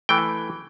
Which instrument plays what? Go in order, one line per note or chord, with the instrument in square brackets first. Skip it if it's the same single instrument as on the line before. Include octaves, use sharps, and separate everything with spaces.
[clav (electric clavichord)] E3 A3 G5